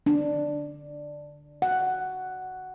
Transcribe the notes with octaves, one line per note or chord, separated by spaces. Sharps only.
D4
F#5